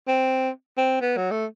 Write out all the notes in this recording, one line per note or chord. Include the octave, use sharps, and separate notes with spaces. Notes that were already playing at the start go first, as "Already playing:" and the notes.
C4
C4
B3
F#3
A3